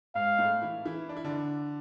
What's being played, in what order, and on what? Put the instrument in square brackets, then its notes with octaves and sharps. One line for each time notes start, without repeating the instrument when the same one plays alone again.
[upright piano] G#2 G#3 [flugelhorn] F5
[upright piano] A2 A3
E3 E4
E3 E4
D4
E4
D3 D4